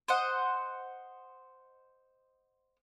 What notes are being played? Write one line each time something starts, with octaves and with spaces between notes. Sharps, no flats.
C5 D#5 F#5